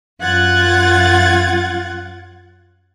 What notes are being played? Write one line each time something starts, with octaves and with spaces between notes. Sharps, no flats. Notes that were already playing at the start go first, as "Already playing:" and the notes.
F#2 F4 F#5 F#6 G#6 A6